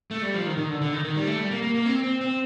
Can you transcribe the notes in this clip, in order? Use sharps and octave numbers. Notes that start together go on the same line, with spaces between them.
A3
G3
F3
D#3
D#3
D3
D3
D#3
D#3
G3
A3
G3
A#3
A#3
A#3
C4
C4
C4